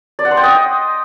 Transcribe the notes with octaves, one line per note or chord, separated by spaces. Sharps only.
D5
F#5
C6
G5
D#5